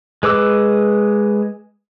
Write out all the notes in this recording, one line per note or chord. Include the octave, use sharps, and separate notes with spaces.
G#3 B4 D6 E6